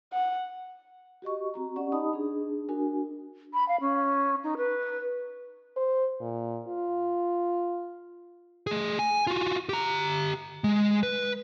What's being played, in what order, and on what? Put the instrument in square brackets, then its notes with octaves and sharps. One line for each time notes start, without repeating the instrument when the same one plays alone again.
[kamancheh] F#5
[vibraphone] F#4 G4 D#5 C#6
C4 F#4 A#5
C#4 G4 D5 F#5 C#6
D#4 G4 D#5 A5 B5 D#6
D4 G#4
D4 F#4 A#4 G#5
[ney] B5
F5
C#4
D#4
B4
[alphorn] C5
A#2
F4
[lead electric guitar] A3 G#4
G#5
F4 F#4
G4 A#5
G#3
B4